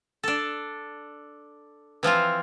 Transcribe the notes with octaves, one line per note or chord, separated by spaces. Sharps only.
D4 A4
E3 F3 C4 F4